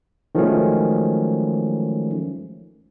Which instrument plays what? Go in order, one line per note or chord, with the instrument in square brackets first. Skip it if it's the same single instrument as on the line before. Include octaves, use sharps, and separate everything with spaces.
[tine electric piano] D#3 F3 F#3 G#3 A3 C#4